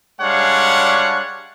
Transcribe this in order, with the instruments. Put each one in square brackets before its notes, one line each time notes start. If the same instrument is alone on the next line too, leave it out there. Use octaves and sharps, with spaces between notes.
[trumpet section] G3 G#3 D4 C#5 F5 F#5